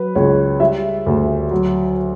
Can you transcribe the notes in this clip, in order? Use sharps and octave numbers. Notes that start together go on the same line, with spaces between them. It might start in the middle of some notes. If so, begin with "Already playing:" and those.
Already playing: F#3 B4
C#2 C#5
G3 E5
D2
F#3